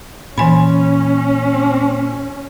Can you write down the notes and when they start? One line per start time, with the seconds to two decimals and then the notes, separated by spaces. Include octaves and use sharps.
0.38 A#2 E3 C#4 G#5 B5